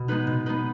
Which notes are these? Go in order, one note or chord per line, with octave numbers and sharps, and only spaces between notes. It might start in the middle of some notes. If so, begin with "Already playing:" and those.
Already playing: B2
G#3 B3 D#4 B4
B2
G#3 B3 D#4 B4